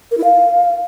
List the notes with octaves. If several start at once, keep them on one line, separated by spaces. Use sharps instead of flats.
A#4
E4
F5